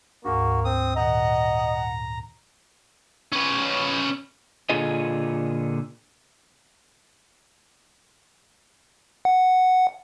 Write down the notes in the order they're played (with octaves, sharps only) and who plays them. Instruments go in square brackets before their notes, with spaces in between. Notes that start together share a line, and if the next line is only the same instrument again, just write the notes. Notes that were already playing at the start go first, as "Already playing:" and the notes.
[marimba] D2 G#2 G#5 [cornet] A#3 [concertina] F#4
[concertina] C4 D#6
[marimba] A#2 D#3 [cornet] D#5 [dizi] F#5 [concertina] A#5
[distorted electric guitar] C#4 B4
[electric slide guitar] A#2 D3 F4 G#4 D#5
[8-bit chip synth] F#5